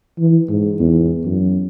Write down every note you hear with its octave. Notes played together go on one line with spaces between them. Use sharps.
E3
G#2
E2
F#2